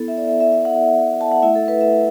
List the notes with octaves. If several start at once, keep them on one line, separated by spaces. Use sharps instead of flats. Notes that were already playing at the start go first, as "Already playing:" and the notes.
Already playing: B3 E4 A4
E5
D5
E5
E5
E5
F#5
A5
F#5
A3 E4 E5
A4
B4
E5